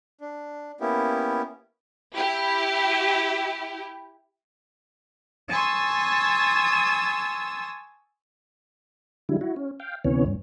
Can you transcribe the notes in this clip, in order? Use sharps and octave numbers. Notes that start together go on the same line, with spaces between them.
D4
A#3 B3 C#4 E4 G4
E4 G4
G#5 A5 C6 C#6 D#6 E6
D3 F#3 G3 E4
E4 F#4
C#4
F5 G5
D2 C3 E3 B3 C#4 C#5
G2